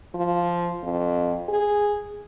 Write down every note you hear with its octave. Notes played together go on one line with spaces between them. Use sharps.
F3
F2
G#4